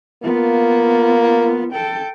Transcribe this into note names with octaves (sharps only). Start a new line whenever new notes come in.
A#3 B3 F4
A4 G5